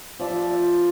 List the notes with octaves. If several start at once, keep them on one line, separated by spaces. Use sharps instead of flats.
F3 D5 E5